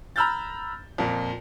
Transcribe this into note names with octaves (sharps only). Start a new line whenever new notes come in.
A#5 B5 E6 F6 G6 A6
F2 A#2